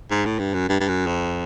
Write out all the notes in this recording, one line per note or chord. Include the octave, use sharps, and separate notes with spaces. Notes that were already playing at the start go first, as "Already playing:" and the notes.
G#2
A2
G2
F#2
G2
G2
F#2
F2